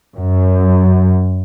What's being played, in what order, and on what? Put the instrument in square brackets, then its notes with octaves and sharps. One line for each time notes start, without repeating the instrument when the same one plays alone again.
[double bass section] F#2